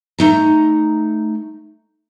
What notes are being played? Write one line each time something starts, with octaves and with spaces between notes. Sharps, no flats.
A3 D#4 A#5